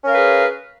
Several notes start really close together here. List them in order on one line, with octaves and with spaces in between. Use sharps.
C#4 A#4 F5 B4 G#4